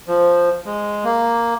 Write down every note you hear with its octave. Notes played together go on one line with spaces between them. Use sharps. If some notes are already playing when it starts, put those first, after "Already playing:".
F3
G#3
A#3